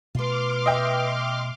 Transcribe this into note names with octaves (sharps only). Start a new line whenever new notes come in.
B2 A3 F4 B4 C6 D6 F6
D#5 E5 G5